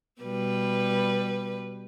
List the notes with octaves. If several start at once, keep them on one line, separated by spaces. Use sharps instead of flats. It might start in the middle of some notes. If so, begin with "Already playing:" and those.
B2 G3 B4